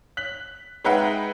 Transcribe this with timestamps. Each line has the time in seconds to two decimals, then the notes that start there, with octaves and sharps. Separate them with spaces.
0.17 F#6 B6 F#7
0.84 G#3 D#4 B4 E5 F#5 G5